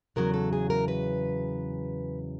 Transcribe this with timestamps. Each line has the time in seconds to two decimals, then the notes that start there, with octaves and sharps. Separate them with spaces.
0.16 E2 C#3 F#3 A#4
0.34 A4
0.53 G#4
0.70 A#4
0.88 B4